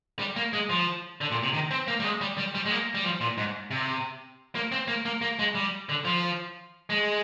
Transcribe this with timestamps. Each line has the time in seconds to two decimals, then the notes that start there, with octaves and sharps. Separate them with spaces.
0.19 G3
0.36 A#3
0.53 G#3
0.69 F3
1.21 D3
1.31 A#2
1.43 C3
1.54 D#3
1.71 C4
1.88 A#3
2.00 G3
2.04 G#3
2.21 G3
2.38 G3
2.55 G3
2.66 G#3
2.71 A#3
2.95 G3
3.04 F3
3.21 A#2
3.38 G#2
3.71 C3
4.55 A#3
4.72 C4
4.88 A#3
5.05 A#3
5.21 A#3
5.39 G#3
5.55 G3
5.89 D3
6.05 F3
6.90 G#3